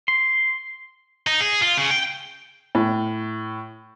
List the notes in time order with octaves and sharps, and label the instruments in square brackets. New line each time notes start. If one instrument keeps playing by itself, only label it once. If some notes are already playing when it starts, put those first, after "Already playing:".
[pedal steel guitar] C6
[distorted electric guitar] D#4
G#4
F4
C#3
G5
[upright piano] A2